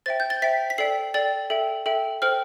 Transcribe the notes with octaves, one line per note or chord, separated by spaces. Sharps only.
C5 E5 G5 A6
G6
A6
C5 E5 G5 B6
B6
A4 D5 G5 C7
A4 D5 G5 A6
A4 E5 G5
A4 E5 G5
A4 C5 G5 F6